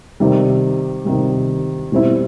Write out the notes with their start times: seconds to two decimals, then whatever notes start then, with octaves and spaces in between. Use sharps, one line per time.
0.20 C3 D#3 G3
1.05 C3 D#3 G3
1.92 B2 G3 C4 E4